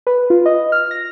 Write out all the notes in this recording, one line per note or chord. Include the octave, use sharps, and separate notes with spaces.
B4
F4
D#5
F6
A#6